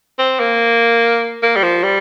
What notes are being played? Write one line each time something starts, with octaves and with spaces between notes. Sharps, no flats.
C4
A#3
A#3
G3
F3
G3